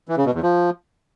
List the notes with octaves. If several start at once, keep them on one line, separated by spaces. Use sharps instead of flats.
E3
C#3
B2
E2
F3